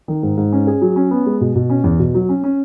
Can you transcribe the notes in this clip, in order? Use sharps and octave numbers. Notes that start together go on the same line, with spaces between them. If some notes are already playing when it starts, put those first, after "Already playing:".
D#3
G#2
G#2
C#4
G#4
F#3
C#4
B3
G#3
B2
B2
C#4
E2
B2
F#3
C#4
C#4